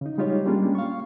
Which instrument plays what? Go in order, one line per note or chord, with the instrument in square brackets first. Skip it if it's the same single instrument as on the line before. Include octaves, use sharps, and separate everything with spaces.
[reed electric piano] C#3 D#4
G3 G#3 D#4 F4 G4 C#5
G3 G#3 A#3 C#4 D4 F4
F5 C#6